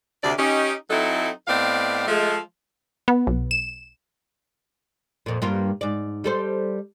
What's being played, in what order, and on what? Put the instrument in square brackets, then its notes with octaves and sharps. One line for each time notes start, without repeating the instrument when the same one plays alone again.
[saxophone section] D2 C3 D5
C#4 D#4 G4
F#3 C4 D#4 E4 A4
A2 B3 C4 D5 D#5 F5
F3 G#3 A3
[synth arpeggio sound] B3
B1
E7
[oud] F2 A#2
G2 A#3 F4
G#2 D5
G3 A4 C5